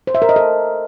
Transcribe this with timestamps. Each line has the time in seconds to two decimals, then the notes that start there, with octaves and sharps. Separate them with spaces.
0.07 C5
0.15 E5
0.22 A#4
0.29 D#5
0.36 A4